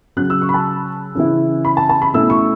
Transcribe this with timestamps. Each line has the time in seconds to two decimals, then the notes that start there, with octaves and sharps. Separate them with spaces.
0.17 C#3 F#3 C#4 F#6
0.30 E6
0.42 C#6
0.49 B5
0.54 A5
1.15 C#3 E3 C#4 E4
1.65 B5
1.77 A5
1.89 A5
2.02 B5
2.14 B2 A3 C#4 E4 E6
2.30 C#6